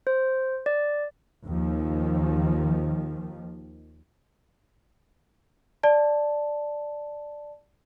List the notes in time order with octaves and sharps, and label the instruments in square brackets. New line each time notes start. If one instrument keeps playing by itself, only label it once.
[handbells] C5
D5
[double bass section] D#2 D#3 F3
[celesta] D5 A5